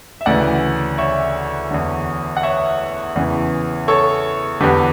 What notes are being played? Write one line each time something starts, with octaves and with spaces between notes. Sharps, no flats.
E5
D2 C#3 E3 D5 F#5
C#5 E5
E2 D3
F#5
C#5 E5
E2 C#3 E3
A4 C#5
E2 D3 G4 B4